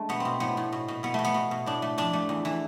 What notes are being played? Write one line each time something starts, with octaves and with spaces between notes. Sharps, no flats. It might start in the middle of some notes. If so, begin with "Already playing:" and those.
Already playing: G#3 A3 D4
B2 B3
C4
B2
A2 B3
A2
B2
B2
B2 B3
B2 A3
B3
B2
B2
A2 D4
A3
F2 D4
A3
E2
E3